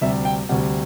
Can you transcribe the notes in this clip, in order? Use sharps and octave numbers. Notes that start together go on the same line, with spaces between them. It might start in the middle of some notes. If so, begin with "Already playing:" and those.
D2 C3 G3 E5
G5
D2 C3 G3 F#5